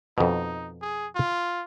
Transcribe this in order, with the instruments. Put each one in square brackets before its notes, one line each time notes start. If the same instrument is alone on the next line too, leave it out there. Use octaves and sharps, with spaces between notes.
[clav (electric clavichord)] F2 B2 [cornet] D#4
[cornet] G#4
F4